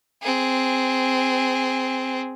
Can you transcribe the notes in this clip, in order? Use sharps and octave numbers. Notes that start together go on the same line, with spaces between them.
C4 G#4